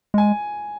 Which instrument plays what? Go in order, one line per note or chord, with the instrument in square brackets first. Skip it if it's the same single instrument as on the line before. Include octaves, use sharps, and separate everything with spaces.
[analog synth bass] G#3 [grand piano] G#5